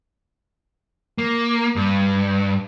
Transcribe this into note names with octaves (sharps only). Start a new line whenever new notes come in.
A#3
G2